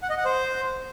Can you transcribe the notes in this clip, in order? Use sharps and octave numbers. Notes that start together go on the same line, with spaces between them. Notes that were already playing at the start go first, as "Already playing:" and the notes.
F#5
D#5
F#5
C5